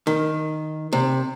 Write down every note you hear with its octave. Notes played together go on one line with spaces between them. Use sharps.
D#3
C3